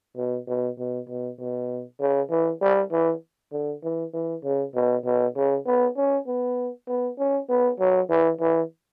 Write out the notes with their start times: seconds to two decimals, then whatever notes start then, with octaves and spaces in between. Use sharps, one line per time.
0.17 B2
0.48 B2
0.78 B2
1.09 B2
1.39 B2
2.00 C#3
2.31 E3
2.61 G3
2.92 E3
3.53 D3
3.83 E3
4.14 E3
4.44 C#3
4.75 B2
5.05 B2
5.36 C#3
5.66 B3
5.96 C#4
6.27 B3
6.88 B3
7.18 C#4
7.49 B3
7.80 F#3
8.10 E3
8.40 E3